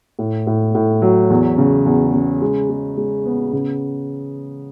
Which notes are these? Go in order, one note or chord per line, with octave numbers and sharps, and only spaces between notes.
A2
A2
A2
F#3
E2
C#3
E2
C#3
G#3
G#3
G#3
B3
C#3